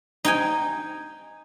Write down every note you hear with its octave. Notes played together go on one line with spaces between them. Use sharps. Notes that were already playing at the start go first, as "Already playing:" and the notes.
D#4 G5 G#5